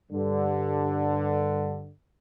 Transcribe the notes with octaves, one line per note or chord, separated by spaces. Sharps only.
G2 D3